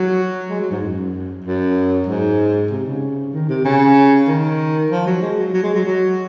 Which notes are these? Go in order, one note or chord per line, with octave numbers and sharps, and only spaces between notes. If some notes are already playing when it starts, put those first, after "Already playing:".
Already playing: F#3
G#3
F#3
G#2
F#2
F#2
G#2
C3
C#3
D#3
C3
C#3
D#3
F3
F#3
G#3
F#3
F#3
G#3
F#3
F#3